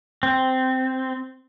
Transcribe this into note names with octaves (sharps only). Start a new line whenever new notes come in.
C4